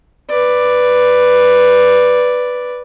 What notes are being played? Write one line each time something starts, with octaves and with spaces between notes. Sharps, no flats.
B4 D5